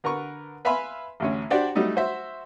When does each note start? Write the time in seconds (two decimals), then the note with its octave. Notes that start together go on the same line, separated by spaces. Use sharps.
0.04 D3 A#4 B4 C#6
0.65 B4 E5 F5 G#5 B5 C6
1.20 A1 D2 C#4
1.50 D4 F#4 G4 C5 D5
1.75 F#3 G3 A3 D#4
1.96 F#4 C5 E5